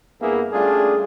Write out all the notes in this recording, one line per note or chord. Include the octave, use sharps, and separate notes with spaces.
G2 A#3 B3 E4 G#4
G3 A3 C#4 D4 F4 G#4